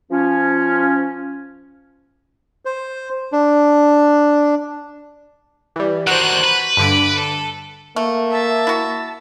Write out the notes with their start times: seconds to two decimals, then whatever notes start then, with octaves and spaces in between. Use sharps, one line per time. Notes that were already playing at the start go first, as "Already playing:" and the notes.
0.11 F3 C#4
2.65 C5
3.32 D4
5.76 E3 G3
6.07 D#3 D4 F#4 C5 F#6
6.44 B4
6.77 G2 D3 B5 D6
7.16 A4
7.96 A3 A#3
8.32 E5 A5
8.67 E4 F#4